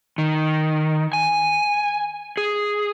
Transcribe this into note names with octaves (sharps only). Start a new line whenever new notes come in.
D#3
G#5
G#4